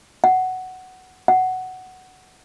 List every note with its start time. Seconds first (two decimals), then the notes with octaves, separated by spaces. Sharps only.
0.24 F#5
1.28 F#5